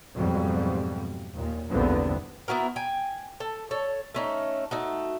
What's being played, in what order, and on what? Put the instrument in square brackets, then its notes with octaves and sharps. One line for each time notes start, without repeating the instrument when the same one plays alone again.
[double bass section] F2 G#2 B2 F#3 G3
D#2 A#2
A#1 E2 G2 D3 B3 C4
[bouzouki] B3 E4 F#4 A#4
G5 G#5
A4
A4 C#5
A3 C#4 D#4
A3 D#4 F#4